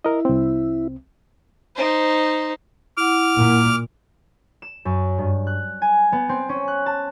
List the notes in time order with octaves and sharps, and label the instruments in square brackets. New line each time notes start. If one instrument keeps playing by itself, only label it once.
[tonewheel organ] E4 [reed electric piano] A#4 D#5
[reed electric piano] C2 C4
[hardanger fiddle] D#4 C5
[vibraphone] E4 F#5 [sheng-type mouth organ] D6 F6
[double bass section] A#2
[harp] E7
F#2
G2
F#6
G#5
B3
C4
C#4
F#6
A5